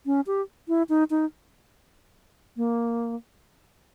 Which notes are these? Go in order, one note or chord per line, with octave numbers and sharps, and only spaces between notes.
C#4
G4
E4
D#4
D#4
A#3